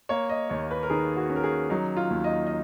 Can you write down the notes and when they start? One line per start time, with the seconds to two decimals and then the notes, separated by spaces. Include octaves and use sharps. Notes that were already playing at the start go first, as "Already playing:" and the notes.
0.09 A#3 C#5
0.29 D#5
0.49 D#2 C#5
0.71 B4
0.83 A#4
0.90 D#3 G#4
1.16 F#4
1.30 C#4
1.36 A#4
1.43 G#4
1.70 F#3 D#4
1.97 F4
2.10 D#2
2.24 D#5
2.46 D#5